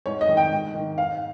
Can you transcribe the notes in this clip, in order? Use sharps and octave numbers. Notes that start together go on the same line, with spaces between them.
G#2 C#5
D#5
D#3
G5
G#2
D#3
G#2 F5